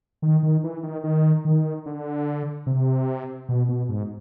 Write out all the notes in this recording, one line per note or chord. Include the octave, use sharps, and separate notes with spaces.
D#3
D#3
E3
D#3
D#3
D#3
D3
C3
B2
B2
G#2